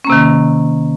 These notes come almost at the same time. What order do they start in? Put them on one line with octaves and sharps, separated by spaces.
C#4 A#3 C3 D#3